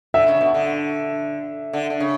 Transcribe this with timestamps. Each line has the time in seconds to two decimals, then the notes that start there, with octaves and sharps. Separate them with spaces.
0.14 D3 E5
0.28 C#3
0.41 B2
0.54 D3
1.73 D3
1.90 D3
2.00 C#3